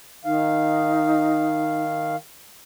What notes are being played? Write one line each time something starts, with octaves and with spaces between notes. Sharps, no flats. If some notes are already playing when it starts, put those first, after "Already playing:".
D#3 D#4 F5